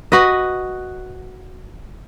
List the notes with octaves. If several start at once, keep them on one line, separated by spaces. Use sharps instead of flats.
F#4 B4 D#5